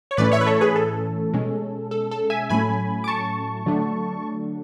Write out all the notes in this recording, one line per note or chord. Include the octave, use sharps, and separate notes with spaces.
C#5
A2 E3 A3 C#4 B4 D5
C#5 E5
B4
A4 C#5
G#4 B4
A4
B2 G#3 C#4
A4
A4
E5 G#5
A2 F#3 A3 C#4 G#5 B5
D6
A5 C#6
D3 F#3 A3 D4